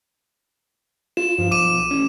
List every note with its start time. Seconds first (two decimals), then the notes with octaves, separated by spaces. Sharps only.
1.17 F4 E7
1.38 G2 F3
1.51 B1 D6 D#7 E7
1.91 A1 C#4